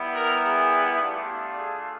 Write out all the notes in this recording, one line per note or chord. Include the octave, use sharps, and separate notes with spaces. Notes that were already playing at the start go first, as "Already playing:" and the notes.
Already playing: G3 B3 E4
A#4
G#4
A3 D4 F4 G4
G#4